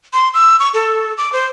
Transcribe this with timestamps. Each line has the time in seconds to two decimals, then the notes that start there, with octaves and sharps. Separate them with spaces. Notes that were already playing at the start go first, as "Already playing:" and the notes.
0.13 C6
0.34 E6
0.60 C#6
0.74 A4
1.17 D6
1.33 C5